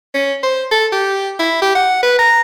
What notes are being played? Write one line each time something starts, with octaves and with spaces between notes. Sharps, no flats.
C#4
C5
A4
G4
E4
G4
F#5
B4
A#5